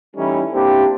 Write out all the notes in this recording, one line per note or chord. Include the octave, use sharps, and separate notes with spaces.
E3 G3 A3 C#4 D#4 E4
A#3 C4 D4 E4 G4